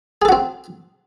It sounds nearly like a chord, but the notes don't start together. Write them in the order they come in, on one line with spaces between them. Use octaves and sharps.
G#4 A4 F#4 C4